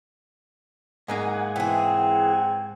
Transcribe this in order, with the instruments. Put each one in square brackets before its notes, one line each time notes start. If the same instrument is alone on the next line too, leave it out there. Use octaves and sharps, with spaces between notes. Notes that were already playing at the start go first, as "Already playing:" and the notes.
[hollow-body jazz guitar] G#2 A#3 D#4 [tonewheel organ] F#5 G#5
[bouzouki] E3 G#4 [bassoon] C4